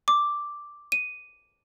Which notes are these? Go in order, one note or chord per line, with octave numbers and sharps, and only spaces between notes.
D6
D#7